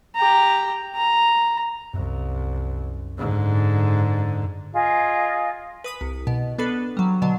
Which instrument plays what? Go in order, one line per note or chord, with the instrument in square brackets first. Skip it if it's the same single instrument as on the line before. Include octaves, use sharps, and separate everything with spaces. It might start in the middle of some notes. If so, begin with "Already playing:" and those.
[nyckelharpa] G4 A#5
A#5
[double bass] C2 [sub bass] F#2
[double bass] G#2 D3
[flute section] F4 G#4 D#5 F5
[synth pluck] B4 D#6 B6
C2
B2
B3 D4 A4 B4
F#3 G3
B2 D3 F#3